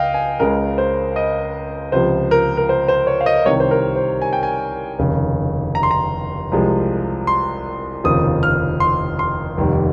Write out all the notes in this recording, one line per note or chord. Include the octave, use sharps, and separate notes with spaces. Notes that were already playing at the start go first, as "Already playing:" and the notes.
Already playing: C#2 D#5 F5 G5
G#5
C#2 C#3 G#3 A#4
C5
D#5
C#2 C3 F3 C5
A#4
A#4
C5
C5
C#5
F5
D#5
C2 C3 D#3 G3 C#5
C5
A#4
C5
G#5
G5
G#5
F1 D#2 C#3
A#5
C6
A#5
C2 C3 F3 G#3
C6
F1 D#2 C#3 F3 D#6
F6
C6
C6
F1 D#2 D#3 G3